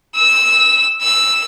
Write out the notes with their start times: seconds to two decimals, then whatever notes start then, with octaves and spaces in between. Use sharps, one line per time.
0.15 E6
1.01 E6